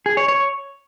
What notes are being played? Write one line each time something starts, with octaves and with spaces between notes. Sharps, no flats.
G#4
C#5
C#5